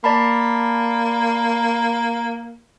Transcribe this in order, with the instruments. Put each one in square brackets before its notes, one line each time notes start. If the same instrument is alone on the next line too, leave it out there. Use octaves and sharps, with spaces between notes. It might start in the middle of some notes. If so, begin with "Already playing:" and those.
[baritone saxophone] A#3 [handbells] D5 A5 B5